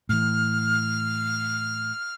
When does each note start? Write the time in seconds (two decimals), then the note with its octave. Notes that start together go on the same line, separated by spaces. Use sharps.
0.09 A2 E3 F6